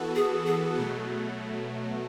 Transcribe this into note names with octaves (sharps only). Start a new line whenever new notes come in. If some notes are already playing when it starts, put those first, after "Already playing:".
Already playing: E3 B3 F#4 A4
G#4
G#4
B2 F#3 A3